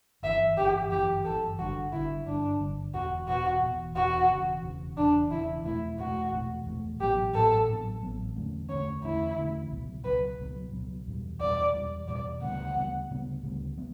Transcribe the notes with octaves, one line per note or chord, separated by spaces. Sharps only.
G1 F#2 E3 E5
G1 F#2 E3 G4
G1 F#2 E3 G4
G1 F#2 E3 A4
G1 G2 D3 F#4
G1 G2 D3 E4
G1 G2 D3 D4
G1 G2 D3
E1 E2 B2 F#4
E1 E2 B2 F#4
E1 E2 B2
E1 E2 B2 F#4
E1 E2 C#3
E1 E2 C#3
E1 E2 C#3 D4
E1 E2 C#3 E4
E2 B2 A3 E4
E2 B2 A3 F#4
E2 B2 A3
E2 B2 A3
A1 A2 F#3 B3 G4
A1 A2 F#3 B3 A4
A1 A2 F#3 B3
A1 A2 F#3 B3
E2 D3 A3 C#4
E2 D3 A3 C#4 C#5
E2 D3 A3 C#4 E4
E2 D3 A3 C#4
C#2 B2 F#3
C#2 B2 F#3 B4
C#2 B2 F#3
C#2 B2 F#3
E2 B2 G3
E2 B2 G3 D5
E2 B2 G3
E2 B2 G3 D5
D2 C#3 G3 B3 F#5
D2 C#3 G3 B3
D2 C#3 G3 B3
D2 C#3 G3 B3
F#3 B3